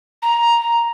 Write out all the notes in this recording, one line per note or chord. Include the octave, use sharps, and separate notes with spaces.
A#5